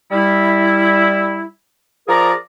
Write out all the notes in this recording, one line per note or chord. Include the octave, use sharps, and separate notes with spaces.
G3 E4
F3 G#4 A#4 D5 A#5